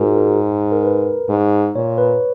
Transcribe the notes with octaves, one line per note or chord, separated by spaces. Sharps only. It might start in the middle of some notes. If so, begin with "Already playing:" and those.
Already playing: G#2 F4 F#4 G#4 A#4
A#4
A#4
B4
G#2
A#2 C#5
B4